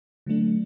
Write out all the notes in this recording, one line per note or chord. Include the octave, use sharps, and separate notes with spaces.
D3 F#3 A3 D4